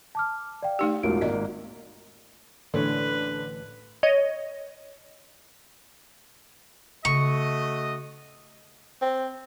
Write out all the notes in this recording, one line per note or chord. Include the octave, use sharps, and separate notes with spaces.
A5 D6 F6
D5 F5 G5
A3 D#4 G4
E1 A1 F4 A#4 D7
G#1 A#3 D5 D#5
A1 A2 D3 B4 C#5
C#5 D#5
C#3 A3 C#4 F#4 D#5 C#6
C4